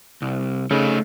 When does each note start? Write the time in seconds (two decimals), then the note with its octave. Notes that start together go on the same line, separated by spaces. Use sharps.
0.22 C2
0.71 C#3 A3 D#4